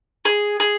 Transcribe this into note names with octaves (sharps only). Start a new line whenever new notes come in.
G#4
G#4